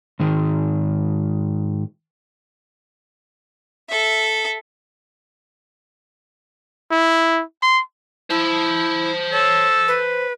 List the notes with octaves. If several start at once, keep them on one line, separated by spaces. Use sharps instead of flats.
G#2 D#3
A4 E5
E4
C6
E4 C5 A5
A4 C#5
B4